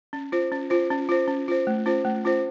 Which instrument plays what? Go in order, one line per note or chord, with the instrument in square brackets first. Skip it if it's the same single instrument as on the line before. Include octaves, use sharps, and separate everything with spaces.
[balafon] C#4
F4 C5
C#4
F4 C5
C#4
F4 C5
C#4
F4 C5
A3
C#4 F4 C5
A3
C#4 F4 C5